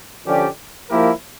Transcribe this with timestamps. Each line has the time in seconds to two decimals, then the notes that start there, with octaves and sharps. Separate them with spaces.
0.25 D3 F3 C#4 G4 D5
0.88 F3 A#3 E4 G4 A#4